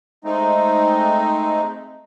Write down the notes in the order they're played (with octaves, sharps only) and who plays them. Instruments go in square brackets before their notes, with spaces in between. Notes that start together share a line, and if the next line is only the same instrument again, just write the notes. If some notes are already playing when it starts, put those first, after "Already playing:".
[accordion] G#3 A3 C4 D#4